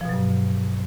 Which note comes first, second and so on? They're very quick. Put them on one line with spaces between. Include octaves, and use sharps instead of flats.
F3 B2 F#3 G2